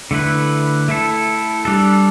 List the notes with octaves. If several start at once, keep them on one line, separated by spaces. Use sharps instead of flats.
D3 A3 E4 B4
A3 E4 A4
G3 D4 A4